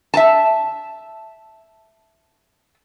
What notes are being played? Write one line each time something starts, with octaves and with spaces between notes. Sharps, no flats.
E5 A5